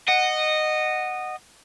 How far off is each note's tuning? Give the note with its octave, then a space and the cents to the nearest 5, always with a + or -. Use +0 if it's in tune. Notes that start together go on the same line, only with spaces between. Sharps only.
D#5 -15 F#5 +0